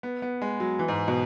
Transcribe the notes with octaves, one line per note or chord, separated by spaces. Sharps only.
B3
B3
G#3
F#3
E3
G#2
B2